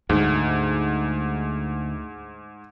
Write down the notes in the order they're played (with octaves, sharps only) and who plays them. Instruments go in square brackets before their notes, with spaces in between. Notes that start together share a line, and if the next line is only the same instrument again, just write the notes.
[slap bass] D2 [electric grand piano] G#2